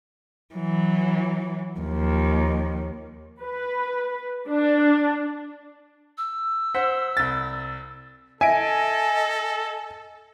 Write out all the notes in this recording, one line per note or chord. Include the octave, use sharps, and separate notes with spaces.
E3 F#3
D#2 F3
B4
D4
E6
C5 F#5 B6
C2 A6
A4 D#5 E5 G#5 D7